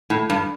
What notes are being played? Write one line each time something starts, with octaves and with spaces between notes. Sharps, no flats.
A2
G2